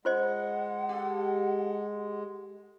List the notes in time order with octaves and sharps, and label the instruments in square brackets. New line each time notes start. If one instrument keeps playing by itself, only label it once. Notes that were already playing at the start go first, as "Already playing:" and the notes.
[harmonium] G#3 [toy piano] F4 C5 D#5 [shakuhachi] F#5
[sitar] G4 A4